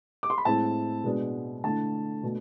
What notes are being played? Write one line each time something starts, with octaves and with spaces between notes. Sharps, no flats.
D6
C6
B5
A2 G#3 C4 E4 A5
B2 G#3 B3 D4
D3 A3 E4 A5
B2 A3 D4